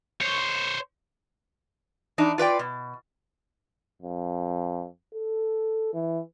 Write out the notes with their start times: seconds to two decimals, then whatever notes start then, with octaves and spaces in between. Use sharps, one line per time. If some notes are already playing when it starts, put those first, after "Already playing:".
0.21 C5 C#5
2.18 E3 D4 D#4
2.38 F4 B4 D5 G5
2.59 B2
4.02 F2
5.14 A4
5.94 E3